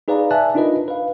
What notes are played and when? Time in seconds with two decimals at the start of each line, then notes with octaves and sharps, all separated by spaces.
0.08 D#4 G#4 B4 D5 F5 A#5
0.31 D5 E5 G#5 A5 F#6
0.55 D4 D#4 F4 A#4 B4 D#5
0.88 B4 F5